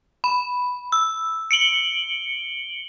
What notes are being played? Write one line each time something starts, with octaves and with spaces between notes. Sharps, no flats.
B5
E6
C#7 D7 F#7 G7